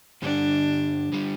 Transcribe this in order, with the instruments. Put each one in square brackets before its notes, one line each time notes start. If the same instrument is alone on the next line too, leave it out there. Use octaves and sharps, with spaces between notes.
[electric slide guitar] G2 D3 G3 [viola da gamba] D4
[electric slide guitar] D3 G3